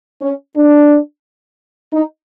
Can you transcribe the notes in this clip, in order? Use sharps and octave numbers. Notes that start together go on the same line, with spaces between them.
C#4
D4
D#4